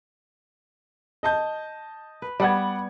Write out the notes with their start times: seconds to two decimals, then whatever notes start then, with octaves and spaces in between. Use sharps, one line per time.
1.23 D#5 A5 G6
2.22 B4
2.40 G3 B3 D5 F#5 G#6